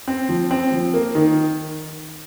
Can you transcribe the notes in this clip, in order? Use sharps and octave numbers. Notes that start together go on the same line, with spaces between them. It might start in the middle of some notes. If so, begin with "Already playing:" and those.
C4
F3
C4
F3
A#3
D#3